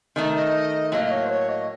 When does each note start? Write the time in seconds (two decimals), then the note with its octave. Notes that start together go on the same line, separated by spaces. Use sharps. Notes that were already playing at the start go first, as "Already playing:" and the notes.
0.16 D#3 A3 D#4
0.35 D#5
0.91 A2 F#3 A#3 D#5
1.04 D#5
1.11 C#5
1.24 C5
1.29 C#5
1.48 D#5